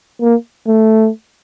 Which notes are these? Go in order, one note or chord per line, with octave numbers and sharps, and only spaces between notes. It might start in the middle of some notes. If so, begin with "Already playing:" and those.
A#3
A3